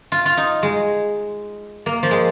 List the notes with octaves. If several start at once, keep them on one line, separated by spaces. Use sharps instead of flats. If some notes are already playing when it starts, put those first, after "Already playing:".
F4
F4
D#4
G#3
A#3
F3
G#3